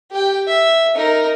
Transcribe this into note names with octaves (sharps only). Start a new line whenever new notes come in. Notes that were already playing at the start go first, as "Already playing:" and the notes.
G4 G5
E5
D#4 A#4